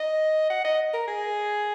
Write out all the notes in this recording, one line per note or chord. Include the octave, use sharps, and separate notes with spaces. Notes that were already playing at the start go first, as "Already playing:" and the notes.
Already playing: D#5
F#5
D#5
A#4
G#4